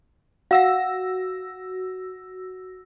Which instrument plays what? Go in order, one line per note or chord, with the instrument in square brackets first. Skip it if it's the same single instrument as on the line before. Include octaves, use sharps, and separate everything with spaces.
[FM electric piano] F#4 E6 A#6 [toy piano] F5 F#5